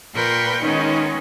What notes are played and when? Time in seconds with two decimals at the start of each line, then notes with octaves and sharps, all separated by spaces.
0.15 A#2 A#4 B4 G5 C6 C#6
0.63 D#3 G#3 B3 C#4 D#4